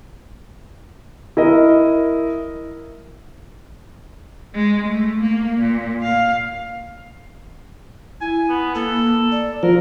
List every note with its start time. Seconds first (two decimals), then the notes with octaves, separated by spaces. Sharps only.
1.37 E4 A#4 D#5
4.54 G#3
4.89 A3
5.22 A#3
5.60 A#2
6.03 F5
8.21 E4 G#5
8.49 B3
8.75 A#3 A4
9.32 D5
9.63 F3 A#4